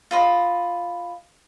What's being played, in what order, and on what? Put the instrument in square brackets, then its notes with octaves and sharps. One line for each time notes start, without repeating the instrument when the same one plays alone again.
[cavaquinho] F4 B4 D#5